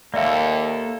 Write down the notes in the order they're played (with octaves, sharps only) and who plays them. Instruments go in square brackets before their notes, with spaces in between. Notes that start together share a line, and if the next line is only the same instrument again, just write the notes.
[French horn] D#2 [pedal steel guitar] A#3 A4 [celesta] D5 E5 F5